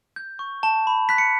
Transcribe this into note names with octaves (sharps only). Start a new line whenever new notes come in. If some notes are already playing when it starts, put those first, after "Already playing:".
G6
C#6
A5
B5
F#6 B6
C#7